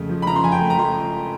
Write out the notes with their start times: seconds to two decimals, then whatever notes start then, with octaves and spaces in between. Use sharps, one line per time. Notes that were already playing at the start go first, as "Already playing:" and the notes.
Already playing: F2 C#3 A3
0.09 F3
0.22 B5
0.27 C#3 A#5
0.36 C6
0.43 F2 G#5
0.52 G5
0.61 A3
0.70 A#5
0.78 F3 C6